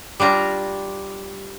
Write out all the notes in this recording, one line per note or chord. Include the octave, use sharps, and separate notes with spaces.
G3 D4 F4 A#5